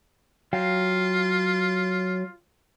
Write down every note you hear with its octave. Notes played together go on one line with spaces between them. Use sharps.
F#3 F4 F5 G5